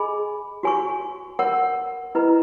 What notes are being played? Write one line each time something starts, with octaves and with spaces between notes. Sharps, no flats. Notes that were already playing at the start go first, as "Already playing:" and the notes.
Already playing: G#4 D#5 G#5 B5
F#4 C#5 G#5 C#6
A#4 C#5 F#5
E4 B4 D#5 A#5